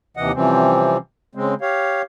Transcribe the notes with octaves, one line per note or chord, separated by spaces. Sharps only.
D#2 C3 E3 D#5 F#5
C3 E3 F3 G3 C4 C#4
C#3 G#3 C4
G4 C#5 F5